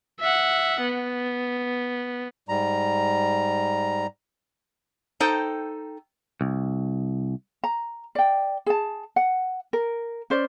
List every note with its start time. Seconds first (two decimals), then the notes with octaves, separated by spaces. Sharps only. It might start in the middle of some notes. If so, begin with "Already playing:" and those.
0.21 E5 F#5
0.81 B3
2.49 G#2 G3 A#5
5.20 D#4 A4 C5 G5
6.41 C2
7.64 A#5
8.15 D5 G5
8.66 G#4 A5
9.16 F#5
9.73 A#4
10.30 C#4 C5 D5